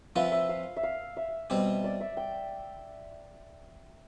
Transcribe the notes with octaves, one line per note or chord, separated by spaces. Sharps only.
F3 C4 F4 B4 E5
E5
F5
E5
F5
E5
B2 G3 C4 G4
D5
E5
G5